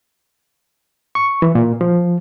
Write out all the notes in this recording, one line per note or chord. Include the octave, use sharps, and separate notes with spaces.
C#6
E3
A#2
F3